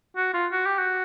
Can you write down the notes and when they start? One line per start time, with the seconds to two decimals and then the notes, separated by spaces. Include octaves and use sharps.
0.16 F#4
0.34 F4
0.52 F#4
0.66 G4
0.79 F#4